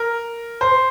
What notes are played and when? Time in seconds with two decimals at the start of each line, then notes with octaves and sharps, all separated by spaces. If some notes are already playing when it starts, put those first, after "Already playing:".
Already playing: A#4
0.61 C5